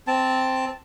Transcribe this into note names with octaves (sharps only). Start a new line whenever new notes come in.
C4 A5